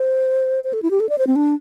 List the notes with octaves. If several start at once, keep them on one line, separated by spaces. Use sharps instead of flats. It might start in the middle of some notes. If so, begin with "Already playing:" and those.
Already playing: C5
C5
A4
E4
G4
A4
D5
C5
C4
D4